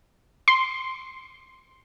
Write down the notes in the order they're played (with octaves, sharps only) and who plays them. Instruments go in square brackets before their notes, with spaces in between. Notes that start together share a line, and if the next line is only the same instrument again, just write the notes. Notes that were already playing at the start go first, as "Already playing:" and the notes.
[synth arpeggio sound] C6